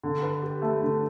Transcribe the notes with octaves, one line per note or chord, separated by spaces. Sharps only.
D3
B4
G4
A3
D3